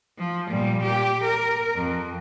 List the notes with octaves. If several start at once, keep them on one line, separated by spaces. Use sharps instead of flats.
F3
A#2 G3
G4
A#4
F2